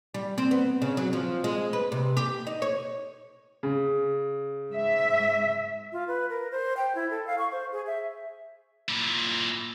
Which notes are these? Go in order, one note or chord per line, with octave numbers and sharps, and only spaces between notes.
G3
C4
B3
C#3
F#3
F3
G#3
B4
C3
G4
D#4
C#5
C#3
G#2 E5
F4
B4
A#4
C5
G5
E4
A4
F5
C#6
C5
G#4
E5
A#2 E4